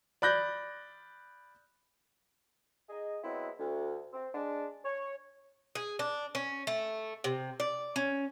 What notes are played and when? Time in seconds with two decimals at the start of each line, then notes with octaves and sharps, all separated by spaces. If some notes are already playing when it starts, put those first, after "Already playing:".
0.22 D5 B5 F#6 G6 A#6
2.90 D#4 G#4 D#5
3.24 F#3 G#3 B3 C4 E4
3.59 D2
4.13 C4
4.35 G#3 D4
4.85 C#5
5.75 G#4
5.99 D4
6.35 C#4
6.67 A3
7.24 C3
7.60 D5
7.96 C#4